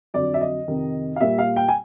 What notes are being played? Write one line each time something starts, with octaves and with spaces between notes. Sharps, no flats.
F2 D3 F#3 D5
E5
D#5
F2 C3 D#3
F5
A#2 G3 A#3 E5
F5
G5
G#5